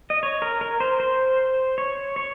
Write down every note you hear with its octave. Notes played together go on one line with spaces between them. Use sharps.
D#5
C#5
A#4
A#4
C5
C5
C#5
C#5